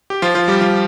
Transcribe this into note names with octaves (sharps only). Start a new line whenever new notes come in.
G4
F3 F4
F3 F4
G3 G4
F3 F4